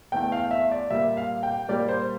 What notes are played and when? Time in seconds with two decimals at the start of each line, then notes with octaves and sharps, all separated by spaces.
0.12 E2 E3 A3 G5
0.32 F5
0.51 E5
0.71 D5
0.90 A#2 G3 A#3 E5
1.17 F5
1.43 G5
1.69 A#2 G3 A#3 D5
1.89 C5